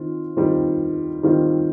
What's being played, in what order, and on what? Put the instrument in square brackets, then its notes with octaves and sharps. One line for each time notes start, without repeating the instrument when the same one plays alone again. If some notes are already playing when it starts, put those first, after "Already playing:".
Already playing: [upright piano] D#3 C4 F4
D#3 G3 C4 F4
D#3 G3 C4 F4